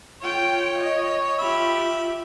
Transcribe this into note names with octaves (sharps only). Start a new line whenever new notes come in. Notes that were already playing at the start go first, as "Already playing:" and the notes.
F4 C#5 G5
D#5
F4 G4 E5 B5